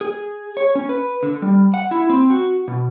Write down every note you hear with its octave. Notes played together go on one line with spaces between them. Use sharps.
G#4
C#5
C#4
B4
D3
G3
F#5
E4
C4
F#4
B2